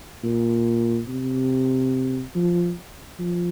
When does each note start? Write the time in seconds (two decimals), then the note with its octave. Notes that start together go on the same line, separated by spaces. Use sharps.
0.24 A#2
1.08 C3
2.35 F3
3.19 F3